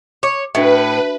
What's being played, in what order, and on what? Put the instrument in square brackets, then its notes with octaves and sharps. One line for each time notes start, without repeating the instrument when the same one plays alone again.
[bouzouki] C#5 [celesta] D6
[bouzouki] A2 [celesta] D4 F#4 E5 [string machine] B4